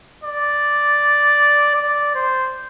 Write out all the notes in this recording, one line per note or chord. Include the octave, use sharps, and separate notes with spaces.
D5
D5
C5